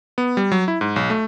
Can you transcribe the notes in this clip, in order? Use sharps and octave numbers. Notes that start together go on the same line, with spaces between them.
B3
G3
F#3
E4
G#2
B1
A3